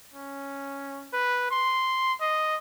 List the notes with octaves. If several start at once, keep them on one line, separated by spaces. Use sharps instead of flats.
C#4
B4
C6
D#5